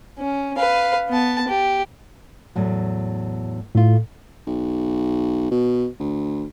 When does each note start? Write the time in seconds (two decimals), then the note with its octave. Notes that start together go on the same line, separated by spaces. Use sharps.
0.18 C#4
0.57 B4 F5
1.10 B3 A5
1.48 G4
2.55 E2 A2 F#3
3.75 A2 A3 F4
4.47 B1
5.51 B2
6.00 D2